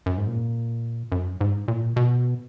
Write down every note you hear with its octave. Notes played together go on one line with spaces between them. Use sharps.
F#2
G#2
A#2
F#2
G#2
A#2
B2